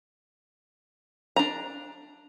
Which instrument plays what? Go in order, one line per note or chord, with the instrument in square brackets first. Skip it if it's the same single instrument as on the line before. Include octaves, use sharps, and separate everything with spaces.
[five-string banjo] D4 A#5